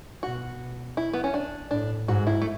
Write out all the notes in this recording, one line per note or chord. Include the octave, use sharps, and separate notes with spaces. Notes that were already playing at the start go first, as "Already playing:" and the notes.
B2 F#4
E4
B3
C#4
D4
A2 D4
G#2 F#4
E4
A3